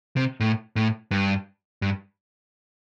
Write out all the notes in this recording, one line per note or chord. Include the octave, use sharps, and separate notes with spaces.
C3
A2
A2
G2
G2